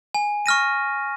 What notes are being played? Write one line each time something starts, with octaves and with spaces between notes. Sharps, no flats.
G#5
C#6 F6 A#6 D#7